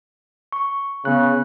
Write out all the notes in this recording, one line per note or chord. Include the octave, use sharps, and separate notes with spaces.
C#6
C#3 B3 F#6